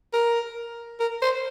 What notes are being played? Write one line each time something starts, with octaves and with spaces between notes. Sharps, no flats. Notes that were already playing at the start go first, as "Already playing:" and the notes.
A#4
A#4
C5